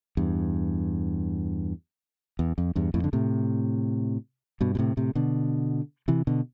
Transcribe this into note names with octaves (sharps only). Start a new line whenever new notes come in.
E2 G2
E2
F2
E2 G2
F2 A2
D3
A2 C3
G2 B2
B2
A2 C3
A2 C3
B2 D3
C3 E3
B2 D3